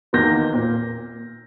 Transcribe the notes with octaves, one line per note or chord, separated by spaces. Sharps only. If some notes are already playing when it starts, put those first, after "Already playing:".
E2 D#3 A#3 G6 A#6
A#2 A#3